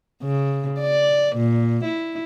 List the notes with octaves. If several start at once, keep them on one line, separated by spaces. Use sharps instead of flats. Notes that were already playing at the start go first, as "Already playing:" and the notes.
C#3
D5
A#2
E4